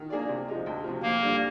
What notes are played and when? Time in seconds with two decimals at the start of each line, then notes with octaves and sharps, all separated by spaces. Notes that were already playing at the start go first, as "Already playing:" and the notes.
Already playing: D#3
0.10 A#3 D4 G#4 D5
0.29 C3
0.48 F3 G#3 D#4
0.66 D2
0.84 C3 F3
1.02 F2 A#3
1.21 D3 G3 D4